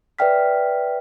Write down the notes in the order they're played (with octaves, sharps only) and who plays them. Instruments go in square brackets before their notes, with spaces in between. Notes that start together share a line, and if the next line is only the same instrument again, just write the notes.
[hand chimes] B4 D5 E5 G5 F6 B6